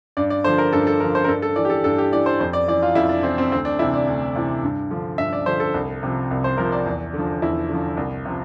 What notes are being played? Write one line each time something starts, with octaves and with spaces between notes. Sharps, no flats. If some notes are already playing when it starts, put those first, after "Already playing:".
G2 D5
D5
D3 F3 C5
A#4
G2 A4
A4
D3 F3 A#4
C5
A#4
G2 A4
A4
E3 D5
G4
A4
G2 A4
G4
E3 D5
C5
F2 C5
D5
E3 D5
F4
F2 E4
D4
E3 C4
C4
D2 C4
D4
C3 E3 E4
D5
D2
C3 E3
G2
D3 F3
G2 E5
D5
D3 F3 C5
A4
C2
C3 F3
C2
C5
C3 F3 A#4
D5
E2
D3 F3
E2 E4
D3 F3
C2
C3 F3